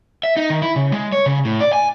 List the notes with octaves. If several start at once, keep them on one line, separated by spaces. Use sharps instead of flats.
E5
D#4
D#3
E4
C#3
G#3
C#5
C#3
A2
D5
G#5